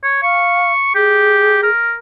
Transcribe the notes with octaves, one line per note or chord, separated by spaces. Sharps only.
C#5
F5 C#6
G4 G#4
A#4